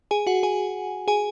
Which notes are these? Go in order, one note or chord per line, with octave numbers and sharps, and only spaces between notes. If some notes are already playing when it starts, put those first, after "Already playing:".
G#4 G#5
F#4 F#5
G#4 G#5
G#4 G#5